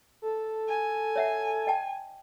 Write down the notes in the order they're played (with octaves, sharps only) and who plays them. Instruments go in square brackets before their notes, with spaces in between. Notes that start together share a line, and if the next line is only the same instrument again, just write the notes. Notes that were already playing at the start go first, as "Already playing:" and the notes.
[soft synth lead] A4
[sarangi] G#5
[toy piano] C#5 E5 F#5
D#5 G5 A5